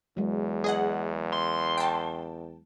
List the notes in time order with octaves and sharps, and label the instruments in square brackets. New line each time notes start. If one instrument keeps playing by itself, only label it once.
[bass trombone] E2 [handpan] F#3 G#3
[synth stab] G#4 D#5 F#5
[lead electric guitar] C6
[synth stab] G5 A5